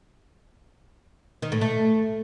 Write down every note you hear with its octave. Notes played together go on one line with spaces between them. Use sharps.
D#3
A2
A3